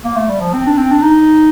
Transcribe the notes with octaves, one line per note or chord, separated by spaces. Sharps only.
A#3
A3
G3
F3
C4
D4
C4
D4
D#4